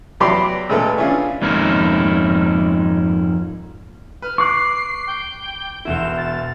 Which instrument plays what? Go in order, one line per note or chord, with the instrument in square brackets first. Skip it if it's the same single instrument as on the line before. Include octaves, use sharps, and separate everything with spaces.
[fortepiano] E2 F#3 G4 B4 D5 C6
A#2 G#3 A3 B3 A4
C#4 D4 E4 F4 G#4
[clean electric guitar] F2 G#2 A#3 C#4 D#4 E4
[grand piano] B4 [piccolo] F6
[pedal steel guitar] C#6 D6 F#6 [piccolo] C7
[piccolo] G5
[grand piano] E1 E2 E4 [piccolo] E7
[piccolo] A6